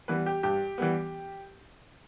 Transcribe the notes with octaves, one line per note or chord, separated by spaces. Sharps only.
E3 G3 B3 B4
G4
G2 G4
E3 G3 B3